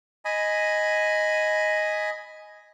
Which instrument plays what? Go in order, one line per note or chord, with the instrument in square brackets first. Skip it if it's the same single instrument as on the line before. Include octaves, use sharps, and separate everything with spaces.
[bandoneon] D#5 G#5 B5